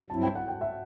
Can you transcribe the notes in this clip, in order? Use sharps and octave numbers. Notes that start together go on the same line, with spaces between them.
G2 F#3 C4 E4 A5
G5
F#5
G5
E5